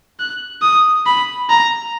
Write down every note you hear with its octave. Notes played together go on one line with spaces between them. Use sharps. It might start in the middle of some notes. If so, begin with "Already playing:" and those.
F#6
D#6
B5
A#5